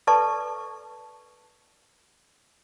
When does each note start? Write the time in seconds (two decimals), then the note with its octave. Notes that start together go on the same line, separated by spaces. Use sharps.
0.07 A4 B4 D5 A5 C#6